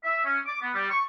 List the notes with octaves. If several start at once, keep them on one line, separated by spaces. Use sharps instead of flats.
E5
C#4
D6
B3
G3
C#6